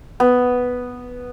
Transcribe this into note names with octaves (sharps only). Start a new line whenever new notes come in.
B3